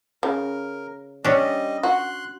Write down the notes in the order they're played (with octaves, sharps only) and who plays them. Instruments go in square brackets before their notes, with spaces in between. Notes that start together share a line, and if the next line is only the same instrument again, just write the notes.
[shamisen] C#3 [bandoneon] A#4
[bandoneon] G3 D#5 [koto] C#4 D4
[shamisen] F#4 [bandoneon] C6 F#6